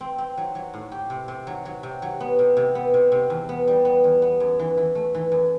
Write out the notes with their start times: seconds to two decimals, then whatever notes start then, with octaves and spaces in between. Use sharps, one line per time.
0.01 C4
0.18 C4
0.37 F#3
0.55 F#3
0.74 A2
0.92 G4
1.10 C3
1.28 C3
1.47 F#3
1.65 F#3
1.83 C3
2.02 F#3
2.20 B3
2.39 C3
2.57 C3
2.75 B3
2.94 C3
3.12 C3
3.30 E2
3.49 B3
3.68 G3
3.85 B3
4.04 E2
4.22 B3
4.40 F#2
4.59 E3
4.77 E3
4.95 A3
5.14 E3
5.32 F#2